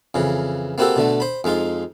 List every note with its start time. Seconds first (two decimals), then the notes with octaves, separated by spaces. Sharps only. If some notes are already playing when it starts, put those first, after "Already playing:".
0.14 F2 C#3 E3
0.78 A#3 C4 E4 F#4 G4 A4
0.96 B2 D3 A3
1.20 C5 B5
1.44 F2 G#3 D#4 F4